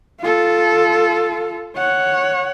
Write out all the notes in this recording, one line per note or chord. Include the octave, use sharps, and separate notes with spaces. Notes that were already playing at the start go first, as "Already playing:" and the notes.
F4 A4
C#5 F#5